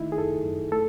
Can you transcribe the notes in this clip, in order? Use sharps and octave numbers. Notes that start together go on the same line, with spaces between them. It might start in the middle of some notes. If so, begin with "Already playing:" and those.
Already playing: D#3 A3 D#4 E4
G#4
F#2 A4
F#2
A3 A4